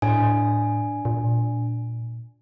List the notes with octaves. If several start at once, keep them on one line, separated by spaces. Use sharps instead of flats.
A2 D4 G#5
A#2